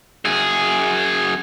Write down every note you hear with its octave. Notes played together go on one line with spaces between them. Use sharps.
F#2 G#4